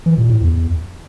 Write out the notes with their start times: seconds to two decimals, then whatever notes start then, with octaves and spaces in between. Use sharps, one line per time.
0.06 E3
0.18 A#2
0.30 A2
0.41 E2